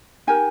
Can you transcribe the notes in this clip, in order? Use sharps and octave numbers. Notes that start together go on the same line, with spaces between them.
D#4 G4 A#4 G#5